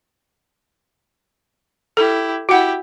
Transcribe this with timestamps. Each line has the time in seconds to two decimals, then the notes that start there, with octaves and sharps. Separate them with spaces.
1.97 E4 G4 A4
2.49 E4 F#4 G4 F#5